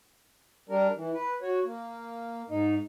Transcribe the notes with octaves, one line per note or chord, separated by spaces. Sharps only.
G3 D4 A#4
E3
B4
F#4 C#5
A#3
G#2 D#4